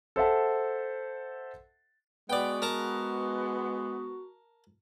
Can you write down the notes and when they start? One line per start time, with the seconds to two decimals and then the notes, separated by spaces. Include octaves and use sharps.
0.16 A4 C5 E5 F#5 A5
2.30 G#3 B3 F#4 D5 G5
2.62 A#4 A5 A#5